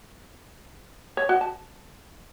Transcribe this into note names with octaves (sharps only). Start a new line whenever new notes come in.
C#5
F#4
A5